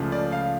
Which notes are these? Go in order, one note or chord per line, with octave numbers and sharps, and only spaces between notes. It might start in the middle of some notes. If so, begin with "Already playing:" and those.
Already playing: C#2 C#3 F3 A3
D5
F5